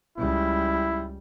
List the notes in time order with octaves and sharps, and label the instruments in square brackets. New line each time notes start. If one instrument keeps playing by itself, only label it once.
[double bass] C#2 G3 [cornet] E4